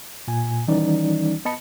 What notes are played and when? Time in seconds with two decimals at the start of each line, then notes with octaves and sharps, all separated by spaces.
0.28 A#2 G#5
0.68 D#3 E3 G3 C#4 D#4 D5
1.45 B3 D#5 A5 B5 C#7